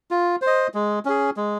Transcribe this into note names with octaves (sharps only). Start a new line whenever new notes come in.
F4
C5
D#5
G#3
C#4 G#4
G#3